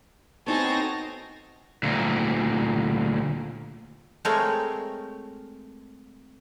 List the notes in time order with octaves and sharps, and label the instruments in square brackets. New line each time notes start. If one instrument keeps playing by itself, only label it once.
[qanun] B3 D#4 F#4 [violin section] C4 G#5 A#6 [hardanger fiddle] A4 C#5
[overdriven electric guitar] D2 A#2
[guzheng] G#3 A3 C4 A#4 C#5 G5